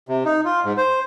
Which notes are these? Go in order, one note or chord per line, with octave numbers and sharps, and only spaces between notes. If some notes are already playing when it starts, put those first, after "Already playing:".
C3
D#4
F4
G#2
C5